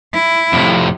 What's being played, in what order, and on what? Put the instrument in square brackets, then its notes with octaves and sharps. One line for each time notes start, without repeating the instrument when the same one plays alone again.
[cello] E4
[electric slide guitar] F2 A2 C3